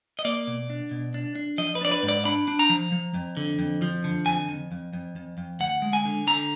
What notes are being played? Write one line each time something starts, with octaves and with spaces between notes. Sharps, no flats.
D#5
A#3 D5
B2
D4
B2
D4
D4
F3 D#5
B4
D4 D5
B4
G#2
D5
D4 B5
D4
A#5
F3
F3
F2
D3
F2
F3
D3
F2 G#5
F2
F2
F2
F2
F2
D2 F#5
G#3
G#5
D3
D3 A#5